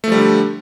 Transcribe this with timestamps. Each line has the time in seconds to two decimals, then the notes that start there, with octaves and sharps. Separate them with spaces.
0.04 A3
0.08 F3
0.12 G3
0.16 D3